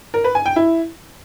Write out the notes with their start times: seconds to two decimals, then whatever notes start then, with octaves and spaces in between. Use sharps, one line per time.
0.14 A#4
0.24 B4
0.35 G#5
0.46 G5
0.56 E4